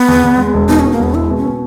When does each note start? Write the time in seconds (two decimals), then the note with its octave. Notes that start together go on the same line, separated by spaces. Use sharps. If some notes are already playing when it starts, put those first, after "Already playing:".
Already playing: B3
0.08 E2
0.23 E2
0.38 G#3
0.54 E1
0.68 B2 D#4
0.80 C#4
0.84 B2
0.92 A#3
0.99 E1 B3
1.14 G#3 E4
1.30 B2
1.37 C#4
1.45 B2